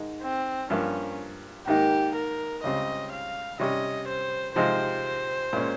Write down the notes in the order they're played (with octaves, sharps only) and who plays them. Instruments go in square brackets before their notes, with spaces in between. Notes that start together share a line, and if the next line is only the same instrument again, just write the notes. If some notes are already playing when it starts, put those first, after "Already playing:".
Already playing: [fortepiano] G#2 D#3 G#3 D#4
[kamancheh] C4
[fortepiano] G2 F3 A#3 [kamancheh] C#4
[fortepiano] G#2 D#3 A#3 D#4 [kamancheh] G4
[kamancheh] A#4
[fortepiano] C#2 C#3 G3 C4 [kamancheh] D#5
[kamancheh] F5
[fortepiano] C3 G3 C#4 [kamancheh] D#5
[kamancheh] C5
[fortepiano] C3 F3 G#3 C4 D#4 [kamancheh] C5
[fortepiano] A#2 G#3 C#4